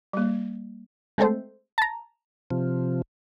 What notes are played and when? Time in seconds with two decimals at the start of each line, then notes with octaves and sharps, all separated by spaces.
0.13 G3 A#3
1.18 G#3 A3 C4 A4 C5
1.78 A5 A#5
2.51 C3 F3